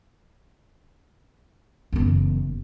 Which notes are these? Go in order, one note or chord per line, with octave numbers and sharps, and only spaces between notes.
F#1 E2